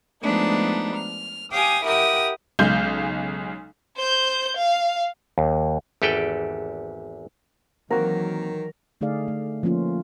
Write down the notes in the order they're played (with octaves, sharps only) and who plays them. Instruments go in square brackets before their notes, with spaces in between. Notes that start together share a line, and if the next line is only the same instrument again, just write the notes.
[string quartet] F3 G#3 A3 B3 D4 D#4
F6
G4 F5 G5 G#5 D6 D#6
E4 G4 A#4 F#5 G5 D#6
[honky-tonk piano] B1 C#3 G#3 G6
[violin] C5 G6
F5
[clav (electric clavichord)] D#2
G#1 E2 G4 A4 B4 G5
[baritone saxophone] D#3 [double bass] E3 F#3 [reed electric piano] A#3 C4 F#4 [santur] A#4
[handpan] D3 A3 D#4 G#4 D5 F5
A3
F3 A3 A#3 C#4 F4